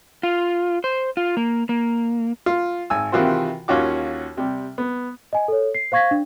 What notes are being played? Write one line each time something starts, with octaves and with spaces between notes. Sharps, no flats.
F4
C5
F4
A#3
A#3
F4
G#1 G#5 E6
C3 D#3 E3 F4 F#4 C5
D#2 C#4 F4 F#4 D6
C3 G3
B3
D#5 G#5
A4 C#5
C7
C5 F5 C#6 G#6 A#6 B6
D4